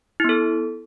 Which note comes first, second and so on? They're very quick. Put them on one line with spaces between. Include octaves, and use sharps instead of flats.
E4 B3 A4